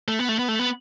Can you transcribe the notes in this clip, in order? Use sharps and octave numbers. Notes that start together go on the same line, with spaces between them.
A3
B3
A3
B3
A3
B3